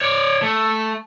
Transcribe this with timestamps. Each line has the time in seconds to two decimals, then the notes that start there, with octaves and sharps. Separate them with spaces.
0.01 C#5 D5
0.42 A3